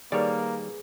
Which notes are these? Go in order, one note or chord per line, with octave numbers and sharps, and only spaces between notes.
D#3 G3 A#3 G#4 B4 C#5 D5